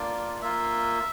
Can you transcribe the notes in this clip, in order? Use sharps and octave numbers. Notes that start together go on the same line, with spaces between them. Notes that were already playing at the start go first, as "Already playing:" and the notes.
Already playing: A#3 D4 F4 D5
A#3 F4 E5